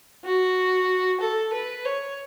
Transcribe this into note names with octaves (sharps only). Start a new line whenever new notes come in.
F#4
A4
B4
C#5